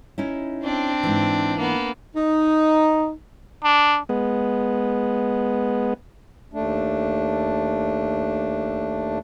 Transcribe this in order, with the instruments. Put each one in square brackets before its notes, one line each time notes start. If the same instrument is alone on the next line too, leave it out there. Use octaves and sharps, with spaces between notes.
[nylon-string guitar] C#4 D#4 E4
[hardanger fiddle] C4 D4
[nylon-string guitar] G#2 E3
[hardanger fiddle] A#3 B3
[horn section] D#4
[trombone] D4
[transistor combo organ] G#3 B3
[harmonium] D#2 A3 D4